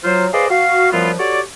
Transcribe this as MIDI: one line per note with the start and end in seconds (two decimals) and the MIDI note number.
0.04 0.27 54
0.04 0.27 65
0.04 0.27 72
0.33 0.46 68
0.33 0.46 71
0.33 0.46 72
0.33 0.46 74
0.33 0.46 75
0.33 0.46 77
0.50 0.92 66
0.50 0.92 77
0.92 1.12 42
0.92 1.12 53
0.92 1.12 55
0.92 1.12 59
0.92 1.12 64
0.92 1.12 65
1.19 1.41 66
1.19 1.41 67
1.19 1.41 69
1.19 1.41 73
1.19 1.41 74